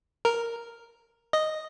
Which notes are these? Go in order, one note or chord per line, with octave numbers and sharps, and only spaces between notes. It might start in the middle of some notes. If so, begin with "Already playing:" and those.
A#4
D#5